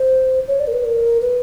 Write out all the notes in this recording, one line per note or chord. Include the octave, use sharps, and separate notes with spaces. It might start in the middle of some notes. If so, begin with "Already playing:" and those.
Already playing: C5
C#5
D5
A#4
B4
A#4
B4